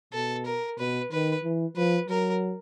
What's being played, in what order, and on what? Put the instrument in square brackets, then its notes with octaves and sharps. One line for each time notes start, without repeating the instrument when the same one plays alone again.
[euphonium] B2 [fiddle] A4
[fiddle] A#4
[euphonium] B2 [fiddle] B4
[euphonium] D#3 [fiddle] B4
[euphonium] E3
[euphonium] F3 [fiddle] B4
[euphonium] F#3 [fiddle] A#4